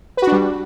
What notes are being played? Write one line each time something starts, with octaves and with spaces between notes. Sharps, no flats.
G3 D4 F#4 B4